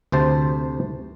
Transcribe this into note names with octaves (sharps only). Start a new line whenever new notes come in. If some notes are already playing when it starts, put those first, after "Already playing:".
D2 C3 C5 A5